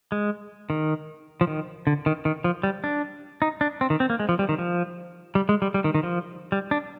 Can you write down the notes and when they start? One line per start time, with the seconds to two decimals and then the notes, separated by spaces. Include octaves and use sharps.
0.12 G#3
0.70 D#3
1.41 F3
1.47 D#3
1.87 D3
2.06 D#3
2.25 D#3
2.44 F3
2.63 G3
2.84 D4
3.42 D#4
3.61 D4
3.81 C4
3.90 D#3
4.00 C4
4.10 A#3
4.20 G#3
4.29 F3
4.39 G3
4.49 D#3
4.59 F3
5.35 G3
5.49 G#3
5.62 G3
5.74 G3
5.84 D#3
5.95 D#3
6.03 F3
6.52 G3
6.71 D4